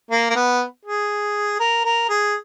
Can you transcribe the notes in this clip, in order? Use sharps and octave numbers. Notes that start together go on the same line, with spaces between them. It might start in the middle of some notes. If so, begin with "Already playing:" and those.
A#3
A#3
B3
G#4
A#4
A#4
G#4